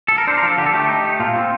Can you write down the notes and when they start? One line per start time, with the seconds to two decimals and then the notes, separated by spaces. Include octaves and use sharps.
0.08 A4
0.18 A#4
0.27 D4 C5
0.38 A#4
0.42 F3
0.48 A4
0.58 D3 G4
0.66 A4
0.74 A3 G4
0.89 D#4
1.04 A3
1.20 A#2 F4
1.35 C4